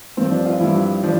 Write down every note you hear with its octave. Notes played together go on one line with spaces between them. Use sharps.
G2 F3 C4
D4
F4
G2 F3 E4
F3 D4